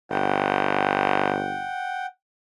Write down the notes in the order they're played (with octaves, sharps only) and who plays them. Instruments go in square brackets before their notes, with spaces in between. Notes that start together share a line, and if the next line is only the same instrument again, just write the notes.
[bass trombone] G1 [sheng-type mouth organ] F#5 G5